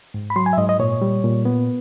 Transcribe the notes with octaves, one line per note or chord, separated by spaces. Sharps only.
G#2
B5
F#3 C6
G#5
E5
G#2 D#5
D#5
A#2 C#5
G3
A#2
B3